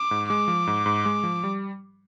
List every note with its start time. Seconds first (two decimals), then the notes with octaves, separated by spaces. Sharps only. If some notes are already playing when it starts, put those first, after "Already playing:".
Already playing: D6
0.11 G#2
0.29 G#3 D6
0.48 F3
0.67 G#2
0.86 G#2
1.06 G#3
1.23 F3
1.44 G3